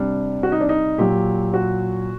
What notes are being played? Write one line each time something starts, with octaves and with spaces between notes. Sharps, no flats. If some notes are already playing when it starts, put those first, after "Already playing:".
Already playing: C3 G3 D4
F#4
D#4
D4
D#4
A#2 F#3 G4
F#4